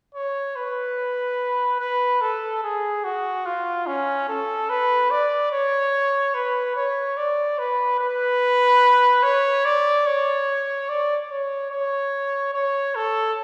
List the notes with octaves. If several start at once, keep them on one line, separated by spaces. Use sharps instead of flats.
C#5
B4
B4
A4
G#4
F#4
F4
C#4
A4
B4
D5
C#5
B4
C#5
D5
B4
B4
C#5
D5
C#5
D5
C#5
C#5
C#5
A4